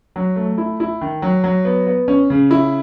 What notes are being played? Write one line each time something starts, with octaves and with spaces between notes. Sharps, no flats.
F#3
A3
E4
E4
D#3
F#3
F#3
B3
B3
C#4
C#3
E4